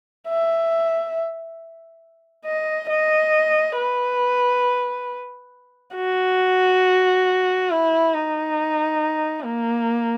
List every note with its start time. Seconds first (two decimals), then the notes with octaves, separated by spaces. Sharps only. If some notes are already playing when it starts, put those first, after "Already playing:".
0.29 E5
2.46 D#5
2.90 D#5
3.77 B4
5.96 F#4
7.71 E4
8.14 D#4
9.45 A#3